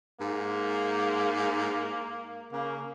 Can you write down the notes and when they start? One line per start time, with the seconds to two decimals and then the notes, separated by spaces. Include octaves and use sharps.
0.21 G#2 A#3
2.52 C#3 A#3